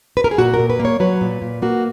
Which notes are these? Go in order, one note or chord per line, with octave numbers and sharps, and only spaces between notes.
B4
A#4
G#4
A#2 F#4
A#4
A#2
B4
A#3
C#5
F#3 B4
A#2
A#2
A#3 F#4